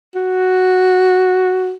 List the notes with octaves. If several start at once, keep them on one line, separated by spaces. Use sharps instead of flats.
F#4